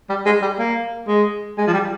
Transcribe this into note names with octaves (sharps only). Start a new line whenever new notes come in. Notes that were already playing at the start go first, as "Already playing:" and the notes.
G3
G#3
G3
A#3
G#3
G#3
F3
G3